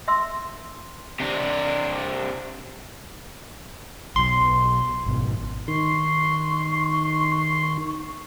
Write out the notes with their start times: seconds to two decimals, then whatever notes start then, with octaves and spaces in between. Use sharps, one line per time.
0.08 E5 C6 E6
1.20 C3 D4
4.16 B1 B2 C6
5.06 G#1 B2
5.68 D#3 C6 C#6